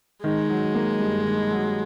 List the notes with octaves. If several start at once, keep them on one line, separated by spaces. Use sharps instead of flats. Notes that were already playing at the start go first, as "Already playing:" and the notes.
D#3 G#3
F#3
A#3
G2
D#3
F#3